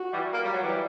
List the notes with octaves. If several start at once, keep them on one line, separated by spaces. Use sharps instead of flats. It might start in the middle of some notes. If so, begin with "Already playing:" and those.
Already playing: F#4
E3 G3
A#3
G3
F#3
E3 G3